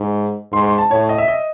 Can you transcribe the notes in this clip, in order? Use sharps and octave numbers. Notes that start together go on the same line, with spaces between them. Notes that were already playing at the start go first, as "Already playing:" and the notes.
Already playing: G#2
G#2 C6
C6
A5
A2 C#5
D#5
E5
D#5